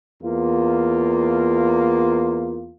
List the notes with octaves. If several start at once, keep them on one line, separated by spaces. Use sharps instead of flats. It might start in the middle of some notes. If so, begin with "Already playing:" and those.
E2 A#3 F4